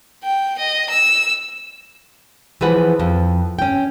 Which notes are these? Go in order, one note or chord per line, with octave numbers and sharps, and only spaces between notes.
G5
D#5
E6
E3 F3 G#4 B4 F#5
F2
C#4 G5